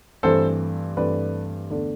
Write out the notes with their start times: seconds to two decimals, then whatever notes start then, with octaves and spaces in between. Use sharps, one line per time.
0.23 G2 E3 A3 C4 A4 C5
0.97 G2 E3 A3 C4 B4 D5
1.70 E2 D3 A3 D4